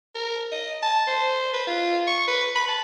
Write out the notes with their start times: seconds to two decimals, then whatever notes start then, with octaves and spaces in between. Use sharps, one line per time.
0.15 A#4
0.52 D#5
0.83 A5
1.07 C5
1.53 B4
1.67 F4
2.07 C#6
2.28 B4
2.55 B5
2.68 A5